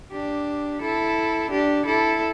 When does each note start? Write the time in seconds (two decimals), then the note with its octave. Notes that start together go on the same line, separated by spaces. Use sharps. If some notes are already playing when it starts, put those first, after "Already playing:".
0.12 D4 G4
0.82 E4 A4
1.51 D4 G4
1.86 E4 A4